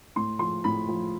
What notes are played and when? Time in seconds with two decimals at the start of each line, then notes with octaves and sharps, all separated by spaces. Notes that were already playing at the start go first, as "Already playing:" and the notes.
0.16 A2 C6
0.39 F3 C6
0.64 A2 B5
0.88 F3